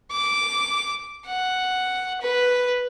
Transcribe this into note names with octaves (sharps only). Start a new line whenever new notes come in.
D6
F#5
B4